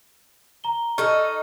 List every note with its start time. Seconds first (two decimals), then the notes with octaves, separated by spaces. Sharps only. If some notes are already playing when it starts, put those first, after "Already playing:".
0.64 A#5 G7
0.98 D#4 A4 D#5 C#6 F6